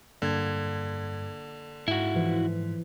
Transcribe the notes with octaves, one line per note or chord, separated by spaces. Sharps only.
G2 D3 A#3 G#6
G#2 E4 F#4
E3 F3